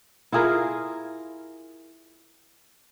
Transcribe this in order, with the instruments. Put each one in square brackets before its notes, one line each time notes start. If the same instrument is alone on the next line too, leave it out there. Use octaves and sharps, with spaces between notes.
[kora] E4 F4 G#4 A#4